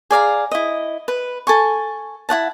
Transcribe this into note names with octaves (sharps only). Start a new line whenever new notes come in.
G#4 D5 F5 A#5
E4 D#5
B4
A4 G#5 C#6
E4 F#4 F#5 A5